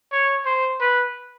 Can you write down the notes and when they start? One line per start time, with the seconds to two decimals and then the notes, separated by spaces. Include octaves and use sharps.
0.12 C#5
0.45 C5
0.81 B4